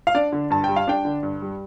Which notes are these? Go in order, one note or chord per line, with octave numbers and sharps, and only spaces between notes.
F5
D4 D5
D3
G2 A5
G3 G5
F5
D4 G5
D3
G2
G3